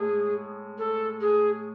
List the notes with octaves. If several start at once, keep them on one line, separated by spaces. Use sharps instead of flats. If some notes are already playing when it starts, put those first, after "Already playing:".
Already playing: A2 G#3 G#4
A4
G#4